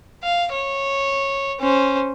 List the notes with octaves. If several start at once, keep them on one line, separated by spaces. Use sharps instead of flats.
F5
C#5
C#4 C5